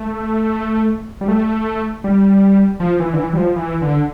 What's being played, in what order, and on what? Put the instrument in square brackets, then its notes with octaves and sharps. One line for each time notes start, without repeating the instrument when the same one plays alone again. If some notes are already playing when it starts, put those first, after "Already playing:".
Already playing: [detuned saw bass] A3
G3
A3
G3
F3
E3
D3
E3
G3
F3
E3
D3